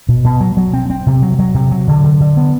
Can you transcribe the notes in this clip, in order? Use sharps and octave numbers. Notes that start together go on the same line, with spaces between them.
B2
B2
F#3
F#3
C4
C4
C3
F#3
F#3
C3
F#3
D3
D3
D3
B3